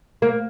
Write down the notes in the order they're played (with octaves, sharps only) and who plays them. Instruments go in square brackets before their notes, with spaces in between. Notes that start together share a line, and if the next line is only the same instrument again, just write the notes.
[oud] A#3